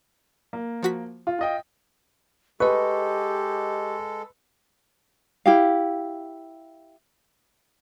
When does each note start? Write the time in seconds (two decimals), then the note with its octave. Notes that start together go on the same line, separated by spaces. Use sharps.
0.53 A#3
0.83 F3 F#4 B6
1.27 F4
1.39 F4 D#5 G5
2.60 G#3 G4 A4 B4 D#5 C#6
5.46 E4 G4 F5